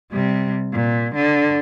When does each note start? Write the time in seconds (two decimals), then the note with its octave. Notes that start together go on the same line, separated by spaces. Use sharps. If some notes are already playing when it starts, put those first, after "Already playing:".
0.12 C3 G3
0.72 A#2
1.15 D3